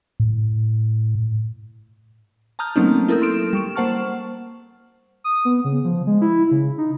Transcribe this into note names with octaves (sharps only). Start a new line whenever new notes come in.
A2
A5 A#5 D#6 F6 G6
F#3 A3 A#3 C4 C#4 D#4
E4 A4 A#4 D#6 G6
C6 F6 D7 E7
G3 C#6 E7
A#3 C5 F#5 A5 C#6 F6
D#6
B3
C#3
F3
G#3
E4
C#3
D#4